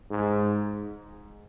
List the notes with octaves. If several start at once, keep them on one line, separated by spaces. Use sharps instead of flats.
G#2